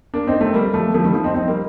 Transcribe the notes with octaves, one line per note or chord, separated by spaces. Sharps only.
A#3 D4
C4 D#4
A3 C4
G3 A#3
F3 A3
F3 A3
D#3 G3
F3
C4 D#4
C4 D#4
G3 A#3